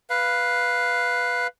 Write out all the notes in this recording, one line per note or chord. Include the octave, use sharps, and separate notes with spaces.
B4 F5